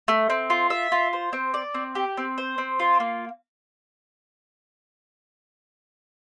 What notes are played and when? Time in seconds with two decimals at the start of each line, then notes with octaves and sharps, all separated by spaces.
0.08 A3
0.30 C4
0.50 F4
0.70 E5
0.92 F4
1.13 C5
1.33 C4
1.54 D5
1.74 C4
1.95 G4
2.17 C4
2.38 C5
2.58 C4
2.79 F4
3.00 A#3